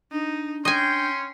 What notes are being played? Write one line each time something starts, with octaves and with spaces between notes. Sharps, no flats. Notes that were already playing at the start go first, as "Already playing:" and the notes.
D4 D#4
C#4 D#5 G5 G#5 C6 G6